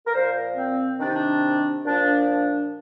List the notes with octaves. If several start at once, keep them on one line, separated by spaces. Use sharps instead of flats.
A#4
A#2 F3 C5
A#4
C4
C3 D#3 D4
D#4
D4
A#2 F3 D4
D4